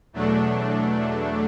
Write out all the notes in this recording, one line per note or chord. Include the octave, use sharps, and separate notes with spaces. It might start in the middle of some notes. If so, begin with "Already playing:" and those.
E2 B2 F#3 A3 D4